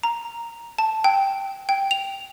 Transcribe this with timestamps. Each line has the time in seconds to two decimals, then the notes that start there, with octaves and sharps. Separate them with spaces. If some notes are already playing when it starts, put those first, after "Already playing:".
0.03 A#5
0.79 A5
1.04 G5
1.69 G5
1.91 F7